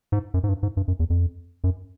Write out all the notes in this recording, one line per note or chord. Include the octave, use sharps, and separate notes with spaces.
G#2
F#2
G#2
G2
G#2
G2
F#2
E2
F2
F#2